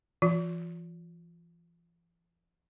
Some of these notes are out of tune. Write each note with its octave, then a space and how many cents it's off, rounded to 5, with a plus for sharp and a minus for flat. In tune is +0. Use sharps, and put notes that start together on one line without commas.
E3 +45 F4 +40